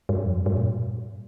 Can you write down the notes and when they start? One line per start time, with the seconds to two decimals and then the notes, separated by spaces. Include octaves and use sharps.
0.09 G2
0.25 F2
0.35 G2
0.46 G2
0.57 A#2